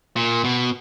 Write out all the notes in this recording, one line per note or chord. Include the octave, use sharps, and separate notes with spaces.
A#2
B2